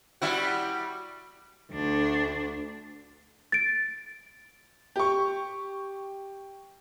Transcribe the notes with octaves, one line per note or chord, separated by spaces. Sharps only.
G3 E4 F#4
D2 D4
A6 D7
G4 C#6